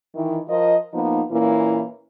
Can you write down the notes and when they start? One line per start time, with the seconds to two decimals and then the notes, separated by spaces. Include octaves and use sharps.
0.15 D#3 E3
0.49 F3 F4 A#4 D#5
0.94 F3 A#3 B3 D#4
1.32 A#2 E3 A#3 C#4 E4